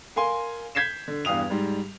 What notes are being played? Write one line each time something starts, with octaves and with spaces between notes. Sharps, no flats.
A#4 F5 G#5 C6
G6 G#6 B6 C7 E7
D3
E2 G2 F5 D#6 F7
G#2 G3